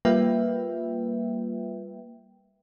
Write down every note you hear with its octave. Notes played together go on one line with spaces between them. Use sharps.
G3 A#3 F4 B4 E5 G5